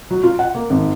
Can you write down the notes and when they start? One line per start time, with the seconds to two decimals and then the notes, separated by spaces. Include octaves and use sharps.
0.11 F#3
0.23 F4
0.39 F#5
0.55 A#3
0.70 G#1